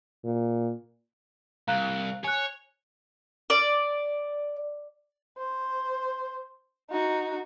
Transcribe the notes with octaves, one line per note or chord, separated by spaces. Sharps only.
A#2
C2 F5 A#5 F#6
C#5 G#5 F#6
D5
C5
D#4 F#4